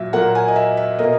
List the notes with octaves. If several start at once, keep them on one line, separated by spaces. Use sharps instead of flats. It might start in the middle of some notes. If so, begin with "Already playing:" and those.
Already playing: A#2 F#3 E5
A#2 F#3 A#3 F#5
G#5
D#5
E5
E5
B2 A#3 D#5